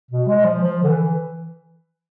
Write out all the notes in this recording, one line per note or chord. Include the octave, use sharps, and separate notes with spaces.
B2
G#3
F3
F3
D3
E3